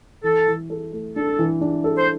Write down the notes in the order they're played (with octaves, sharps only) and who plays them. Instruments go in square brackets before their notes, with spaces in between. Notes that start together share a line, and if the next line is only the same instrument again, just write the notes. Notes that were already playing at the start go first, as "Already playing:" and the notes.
[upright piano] E3 [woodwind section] A4
[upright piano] E3
A4
A3
[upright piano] D4 [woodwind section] A4
[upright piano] E3
D4
A4
[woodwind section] C5